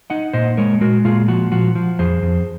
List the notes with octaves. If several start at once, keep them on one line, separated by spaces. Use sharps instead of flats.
D#4 D#5 F#5
A#2 C5 D#5
G#3 A#4 C#5
G#3 F#4 A#4
A#2 F4 G#4
F3 F#4
F3 F#4
F3
F2 G#4 C5
F2